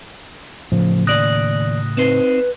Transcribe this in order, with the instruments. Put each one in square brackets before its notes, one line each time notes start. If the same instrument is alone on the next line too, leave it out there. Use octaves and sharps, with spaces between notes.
[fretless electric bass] A2 C#3 [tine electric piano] F3
[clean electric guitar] D#2 D5 [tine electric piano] D#6 F#6 A#6
[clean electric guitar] C4 D#4 C5 [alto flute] B4